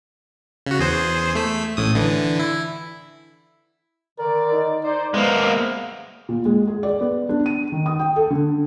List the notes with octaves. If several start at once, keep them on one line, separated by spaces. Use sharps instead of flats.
C#3 F#4
E2 G#4 C5
A3 B6
A1 A2 D#6
D3 E3
E4
D3 D#3 A#4 D5
D#4
D#4 C5 D5
G#3 A#3 B3 C5 E5 F5
A#2
G#3
G#4
D5
B3
D4
D#7
D#3
D#6
G5
A4
D3